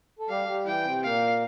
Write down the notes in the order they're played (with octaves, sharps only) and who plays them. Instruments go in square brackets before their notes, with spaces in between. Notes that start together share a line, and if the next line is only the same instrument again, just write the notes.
[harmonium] A4
[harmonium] G3 G4 [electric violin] F5
[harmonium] G3 G4
[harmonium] E3 E4 [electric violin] G5
[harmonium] C3 C4
[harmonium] A#2 A#3 [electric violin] F5